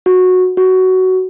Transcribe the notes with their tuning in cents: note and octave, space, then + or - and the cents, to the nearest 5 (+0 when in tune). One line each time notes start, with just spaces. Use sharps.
F#4 -10
F#4 +15